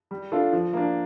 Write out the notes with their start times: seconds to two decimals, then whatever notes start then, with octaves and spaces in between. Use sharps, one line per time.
0.11 G3
0.32 D4 F4 A4
0.53 F3
0.73 A#3 D4